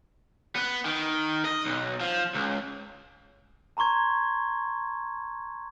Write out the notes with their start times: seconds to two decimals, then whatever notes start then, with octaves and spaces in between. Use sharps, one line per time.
0.56 B3
0.85 D#3
1.45 D#5
1.65 B1
2.00 F3
2.34 C#2
3.77 A5 A#5 C6 C#6 G#6